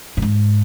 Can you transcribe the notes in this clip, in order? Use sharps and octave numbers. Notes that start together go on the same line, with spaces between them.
A2
G#2